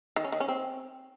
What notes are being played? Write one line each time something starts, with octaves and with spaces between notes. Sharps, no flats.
D#3
C#4
D#3
C#4
C4